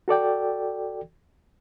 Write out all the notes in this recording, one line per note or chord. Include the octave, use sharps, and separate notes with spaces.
F#4 A4 D5 G5